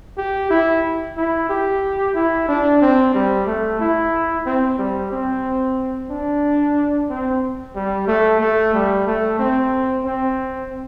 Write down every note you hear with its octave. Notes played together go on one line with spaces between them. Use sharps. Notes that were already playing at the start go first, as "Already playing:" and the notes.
G4
E4
E4
G4
E4
D4
C4
G3
A3
E4
C4
G3
C4
D4
C4
G3
A3
A3
G3
A3
C4
C4